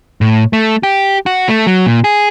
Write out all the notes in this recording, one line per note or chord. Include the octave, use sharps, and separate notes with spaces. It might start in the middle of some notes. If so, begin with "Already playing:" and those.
A2
A3
G4
F#4
A3
F#3
A#2
G#4